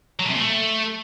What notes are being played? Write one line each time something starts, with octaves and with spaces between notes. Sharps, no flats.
F#3
B2
C3
A#2
A3